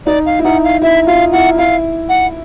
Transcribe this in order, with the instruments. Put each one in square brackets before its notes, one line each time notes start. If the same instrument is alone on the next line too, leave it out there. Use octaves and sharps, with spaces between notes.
[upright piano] D#4 [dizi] D5
[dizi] F5
[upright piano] E4
[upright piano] D#4 [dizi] F#5
[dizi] F5
[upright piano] E4 [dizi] E5
[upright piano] F4 [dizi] F5
[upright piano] E4 [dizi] F#5
[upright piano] E4 [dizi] F5
[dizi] F#5